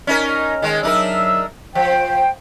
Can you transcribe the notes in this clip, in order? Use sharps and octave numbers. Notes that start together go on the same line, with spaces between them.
C#4 D#4 A#4
D#3 G#3
F#3 D4 D#4 A#4 E5 E6
F3 C5 G5